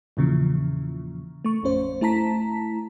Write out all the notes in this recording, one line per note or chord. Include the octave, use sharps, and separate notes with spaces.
E2 A#2 C#3 E3 F3
A3 C#6
A1 F2 C#4 C5
A3 E4 A5 A#5 B6